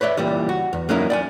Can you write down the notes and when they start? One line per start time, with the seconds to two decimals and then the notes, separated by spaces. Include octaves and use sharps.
0.01 B4 C#5 D5 E5
0.17 C#2 A#2 E3 G3
0.49 F#4
0.73 E2
0.89 F#3 A#3 C#4 D#4 E4 A#4
1.10 D5 G5 G#5